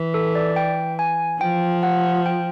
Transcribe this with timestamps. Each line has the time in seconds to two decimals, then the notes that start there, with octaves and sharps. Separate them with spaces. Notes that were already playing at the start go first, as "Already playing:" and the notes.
Already playing: E3
0.14 A4
0.35 D5
0.56 G5
0.99 G#5
1.41 F3 G5
1.83 F#5
2.26 G5